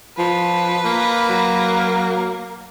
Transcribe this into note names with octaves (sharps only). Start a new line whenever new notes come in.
F3 B4
A#3
F#3